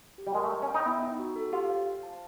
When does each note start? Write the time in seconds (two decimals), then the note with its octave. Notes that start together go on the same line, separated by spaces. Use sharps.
0.18 G4
0.27 G3
0.35 G#3 A#4
0.44 A3
0.52 D#5
0.62 C#4
0.69 G5
0.74 D#4
0.86 B3 E4
1.02 D#4
1.19 F#4
1.36 A4
1.52 F4 G4
1.70 C5
1.86 F5
2.03 A5